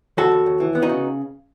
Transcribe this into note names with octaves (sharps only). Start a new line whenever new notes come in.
D#2 F#4 A4
D#2
D#2
E3
B3
D#4 F#4
C#3